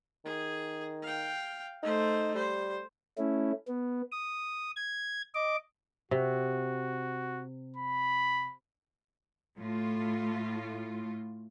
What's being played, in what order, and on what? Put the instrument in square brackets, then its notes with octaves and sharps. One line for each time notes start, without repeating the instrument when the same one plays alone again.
[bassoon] D#3 [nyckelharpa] G#4
[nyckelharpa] F5 G5
[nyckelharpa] A3 C5 [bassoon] D#4
[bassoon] G3 [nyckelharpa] C5
[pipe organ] A3 C#4 E4
B3
D#6
G#6
D#5 D6
[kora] C3 [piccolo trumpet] F#4
[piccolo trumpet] B5
[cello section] A2 A3 F4